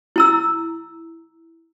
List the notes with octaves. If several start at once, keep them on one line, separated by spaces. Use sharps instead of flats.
E4 A#5 E6